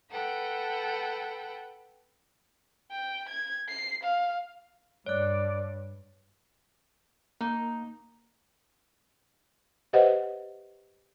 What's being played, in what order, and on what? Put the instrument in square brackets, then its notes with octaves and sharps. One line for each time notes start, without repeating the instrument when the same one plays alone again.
[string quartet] A4 B4 F#5 G5
[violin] G5
G#6
C7
F5
[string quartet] G2 [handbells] C#5 F#6 [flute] D5
[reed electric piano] A#3 [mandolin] D#4
[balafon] G4 B4 C5 D#5 E5 F#5